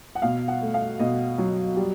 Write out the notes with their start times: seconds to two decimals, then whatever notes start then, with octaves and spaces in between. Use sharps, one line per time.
0.15 F#5
0.22 B2 F5
0.48 F#5
0.61 A3
0.74 F5
0.99 B2 D#5
1.38 F#3
1.76 G3